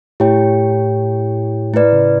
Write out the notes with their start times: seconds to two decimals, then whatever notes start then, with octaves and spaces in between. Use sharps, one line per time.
0.20 A2 E4 G4 C#5 G5
1.73 A2 E4 B4 D5
1.93 C#3